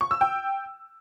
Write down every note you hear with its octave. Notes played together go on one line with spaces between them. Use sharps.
C#6
E6
G5